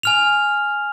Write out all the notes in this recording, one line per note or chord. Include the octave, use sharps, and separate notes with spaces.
G#5 F6 F7